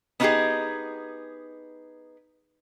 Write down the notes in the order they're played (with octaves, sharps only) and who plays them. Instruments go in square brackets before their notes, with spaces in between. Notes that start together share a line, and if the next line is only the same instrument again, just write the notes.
[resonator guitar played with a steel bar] B3 C#4 D#4 F4 G4 G#4